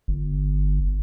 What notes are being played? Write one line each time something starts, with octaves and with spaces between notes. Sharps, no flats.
G1